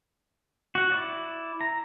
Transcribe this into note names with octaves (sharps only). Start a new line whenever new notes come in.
F#4 F#5
E4 D5
A#5